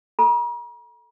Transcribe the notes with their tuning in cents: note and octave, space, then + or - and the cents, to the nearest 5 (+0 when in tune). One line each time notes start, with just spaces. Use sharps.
A4 +0 A#5 +45